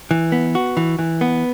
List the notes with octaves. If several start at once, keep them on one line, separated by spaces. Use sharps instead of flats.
E3
B3
F#4
E3
E3
B3